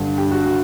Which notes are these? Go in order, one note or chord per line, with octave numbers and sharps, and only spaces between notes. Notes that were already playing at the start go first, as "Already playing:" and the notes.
Already playing: G2 D3
G4
F#4
F#4